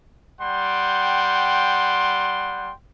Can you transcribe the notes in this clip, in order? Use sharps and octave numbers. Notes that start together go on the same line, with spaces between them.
G3 F#5 G5 C6